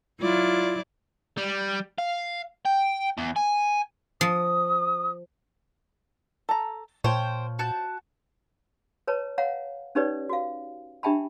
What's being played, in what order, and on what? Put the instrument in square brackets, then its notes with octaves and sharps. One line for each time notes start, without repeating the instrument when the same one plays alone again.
[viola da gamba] F#3 E4 D5 [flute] F4
[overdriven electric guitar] G3
F5
G5
E2
G#5
[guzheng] F3 [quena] D#6
[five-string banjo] A4 A#5
[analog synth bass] A#2 [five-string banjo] F3 C#5 [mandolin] C5 G5
[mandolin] F#4 A5 G6
[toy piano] B4 C#5 A5 A#5
C#5 F5 F#5 A#5
C#4 D#4 G4 B4 C#5 D5
F#4 F5
D4 G4 E5 G5 A5 B5